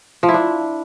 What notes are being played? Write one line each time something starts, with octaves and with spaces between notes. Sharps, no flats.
F3
E4
D4